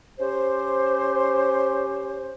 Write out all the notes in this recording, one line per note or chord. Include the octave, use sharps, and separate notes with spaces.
C#4 G4 C5